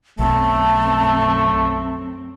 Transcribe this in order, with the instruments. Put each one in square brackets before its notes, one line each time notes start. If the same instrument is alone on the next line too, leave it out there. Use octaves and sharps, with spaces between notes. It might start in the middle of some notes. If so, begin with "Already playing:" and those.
[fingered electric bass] B1 [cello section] F#2 C4 [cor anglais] A3 [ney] A5